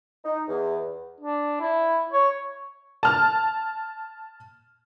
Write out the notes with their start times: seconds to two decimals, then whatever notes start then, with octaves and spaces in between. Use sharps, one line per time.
0.24 D#4
0.48 E2
1.20 D4
1.60 E4
2.12 C#5
3.03 A5 F6